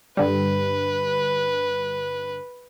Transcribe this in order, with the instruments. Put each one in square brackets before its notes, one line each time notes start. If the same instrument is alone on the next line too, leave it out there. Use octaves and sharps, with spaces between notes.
[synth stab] G2 D3 G3 [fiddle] B4